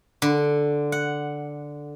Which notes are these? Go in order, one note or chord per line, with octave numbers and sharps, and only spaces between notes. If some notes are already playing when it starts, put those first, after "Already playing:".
D3
F#5